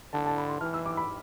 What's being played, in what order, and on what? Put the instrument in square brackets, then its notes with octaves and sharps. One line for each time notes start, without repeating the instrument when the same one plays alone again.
[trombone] D3 [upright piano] A5
[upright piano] A5
B5
C6
[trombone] E3 [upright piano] F6
[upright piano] E6
D6
B5